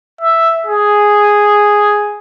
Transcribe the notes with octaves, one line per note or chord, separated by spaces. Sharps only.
E5
G#4